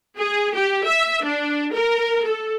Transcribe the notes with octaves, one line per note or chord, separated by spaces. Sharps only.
G#4
G4
E5
D4
A#4
A4